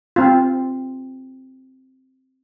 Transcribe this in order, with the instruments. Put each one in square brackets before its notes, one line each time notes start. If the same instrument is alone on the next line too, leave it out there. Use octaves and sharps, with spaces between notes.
[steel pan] C4 F4